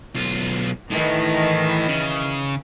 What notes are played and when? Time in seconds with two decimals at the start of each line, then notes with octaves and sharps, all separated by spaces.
0.15 B1 F4
0.92 A2 D#3 E3
1.89 C#3